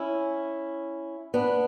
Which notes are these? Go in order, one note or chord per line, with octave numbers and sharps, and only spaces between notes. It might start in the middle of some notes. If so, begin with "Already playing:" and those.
Already playing: C#4 E4
B3 D4